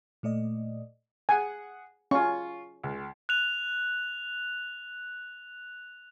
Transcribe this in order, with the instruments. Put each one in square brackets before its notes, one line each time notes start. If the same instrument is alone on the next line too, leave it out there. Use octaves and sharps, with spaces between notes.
[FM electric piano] A#2 A3 D5 D#5
[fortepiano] G#4 F#5 [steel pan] G#5
[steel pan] C#4 [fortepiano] F4 C#6
[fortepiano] C#2
[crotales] F#6 F7